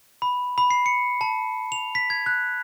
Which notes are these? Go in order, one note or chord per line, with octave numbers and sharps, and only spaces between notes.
B5
B5
C7
C#7
A5
F7
B6
G#6
F#6